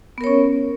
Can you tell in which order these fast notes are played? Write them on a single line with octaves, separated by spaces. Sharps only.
B3 A#4 C#5 C#4